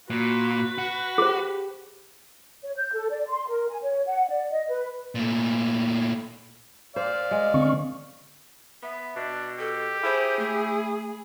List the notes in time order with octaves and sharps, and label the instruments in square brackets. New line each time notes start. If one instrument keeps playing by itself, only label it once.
[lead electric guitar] A#2 [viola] F#4 [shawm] B4
[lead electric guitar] F#4
[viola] G4 [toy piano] G#4 C5
[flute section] C#5
G6
A4
D5
C6
A#4
G#5
C#5
F#5
D5
D#5
B4
[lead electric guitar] A#2 A3
[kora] C5 [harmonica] D5 F5
[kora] G#3
[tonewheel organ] D3 C4 C#6
[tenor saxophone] B3 [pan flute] E5
[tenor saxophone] B2 [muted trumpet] D4
[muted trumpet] G4 [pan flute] A4
[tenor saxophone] E4 [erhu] G#4 [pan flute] C5
[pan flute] A3